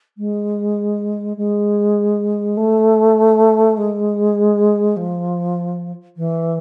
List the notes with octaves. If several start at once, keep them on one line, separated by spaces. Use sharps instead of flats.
G#3
G#3
A3
G#3
F3
E3